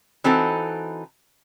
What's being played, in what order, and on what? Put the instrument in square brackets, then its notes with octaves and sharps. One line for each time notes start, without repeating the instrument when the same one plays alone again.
[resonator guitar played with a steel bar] E3 C4 D#4 F#4 A4